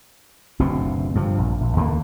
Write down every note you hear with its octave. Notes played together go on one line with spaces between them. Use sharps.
F#1 D2 B2 C4
G2 C3 F3
A#1
A#1
D#2 D3 A3 A#3